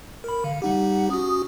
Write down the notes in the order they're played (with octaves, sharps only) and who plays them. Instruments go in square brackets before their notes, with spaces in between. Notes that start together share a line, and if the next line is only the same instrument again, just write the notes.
[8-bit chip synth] A#4 B5
[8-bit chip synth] D3 [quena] F5
[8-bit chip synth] G3 D#4 G4 [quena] F#5
[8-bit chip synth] C#4 F#4 [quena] D#6